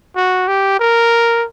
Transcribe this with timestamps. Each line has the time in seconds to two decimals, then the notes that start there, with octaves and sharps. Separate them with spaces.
0.16 F#4
0.48 G4
0.79 A#4